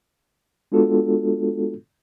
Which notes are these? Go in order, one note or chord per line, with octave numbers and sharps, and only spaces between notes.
G#3 B3 D4 F4 F#4 A4